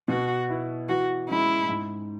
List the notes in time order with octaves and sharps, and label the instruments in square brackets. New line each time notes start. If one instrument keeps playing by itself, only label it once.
[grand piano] B2 [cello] F#4
[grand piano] B3 E4
[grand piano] E3 [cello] F#4
[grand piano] G#3 C#4 [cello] E4
[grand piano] G#2